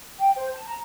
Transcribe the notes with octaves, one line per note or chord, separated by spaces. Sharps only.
G5
C5
A5
A#5